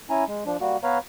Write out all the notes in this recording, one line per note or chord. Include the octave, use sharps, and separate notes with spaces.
C#4 E4 G#5 A#5
G#3
F3 D4
G3 A#3 F#4
B3 B4 C#5 F5 A#5